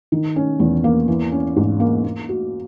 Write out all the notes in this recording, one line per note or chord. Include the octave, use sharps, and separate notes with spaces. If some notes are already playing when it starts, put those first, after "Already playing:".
D#3
C#4
E2
A#3
E3
C#4
G#2
A#3
A#3
F#4